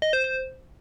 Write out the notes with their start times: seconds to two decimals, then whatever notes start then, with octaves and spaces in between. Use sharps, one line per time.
0.02 D#5
0.13 C5
0.24 C5